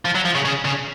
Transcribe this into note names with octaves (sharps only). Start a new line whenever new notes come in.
F3
F#3
F3
C#3
C#3
C#3